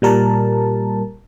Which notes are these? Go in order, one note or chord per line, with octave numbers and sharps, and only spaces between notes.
A#2 G3 A#4 A5